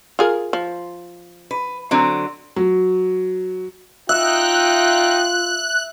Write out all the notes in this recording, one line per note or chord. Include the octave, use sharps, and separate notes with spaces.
F4 G#4 A#4
F3
B4
D3 F#3 C4
F#3
D#4 F4 E5 G5 F#6